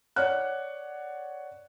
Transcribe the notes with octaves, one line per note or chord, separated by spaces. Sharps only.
C#5 D5 F#5 F#6